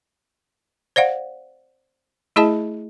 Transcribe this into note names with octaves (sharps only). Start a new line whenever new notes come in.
C5 D5 F5 F#5
A3 E4 G#4 D#5 A5